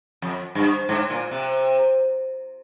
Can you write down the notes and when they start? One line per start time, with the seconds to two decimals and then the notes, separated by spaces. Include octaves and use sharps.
0.22 F2
0.55 G2
0.89 G#2
1.10 A#2
1.31 C3